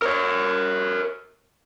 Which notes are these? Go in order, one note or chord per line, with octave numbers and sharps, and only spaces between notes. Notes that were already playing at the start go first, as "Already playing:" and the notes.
A#4 C#5